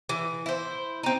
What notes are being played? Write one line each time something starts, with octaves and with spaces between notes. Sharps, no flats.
E3
E4 C5
C4 D#4